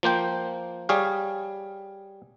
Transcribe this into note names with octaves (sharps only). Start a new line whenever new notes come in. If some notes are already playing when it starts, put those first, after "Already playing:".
F3 A#3 C5 G5
G3 G#4 C#5 F5